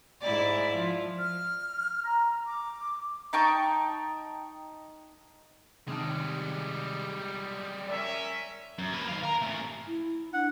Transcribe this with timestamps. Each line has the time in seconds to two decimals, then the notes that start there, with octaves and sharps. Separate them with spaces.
0.21 G#2 E4 D5
0.74 F3
1.19 F6
2.04 A#5
2.45 D6
3.33 D#4 G5 A5 C#6
5.88 C3 D#3 G3 G#3 A5
7.88 C#4 A#4 D5 E5
8.79 F#2
8.92 A#3 B4
9.08 D#3 F5
9.23 A#4 A#5
9.42 A3 C#4
9.87 E4
10.34 D4 F#5